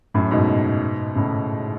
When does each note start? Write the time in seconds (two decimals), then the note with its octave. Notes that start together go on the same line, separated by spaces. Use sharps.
0.14 F#2 A2
0.31 G#2 B2
1.16 A2 C#3